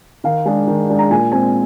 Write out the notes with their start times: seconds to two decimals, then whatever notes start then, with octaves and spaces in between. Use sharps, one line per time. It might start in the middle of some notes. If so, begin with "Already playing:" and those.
0.24 D#3 F5
0.45 G#3 D4
0.68 D#3
0.89 G#3 D4
0.99 A#5
1.10 A#2 G#5
1.32 G#3 C4 G#5